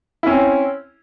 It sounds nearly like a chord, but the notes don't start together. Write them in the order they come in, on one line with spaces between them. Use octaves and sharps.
E4 C#4 C4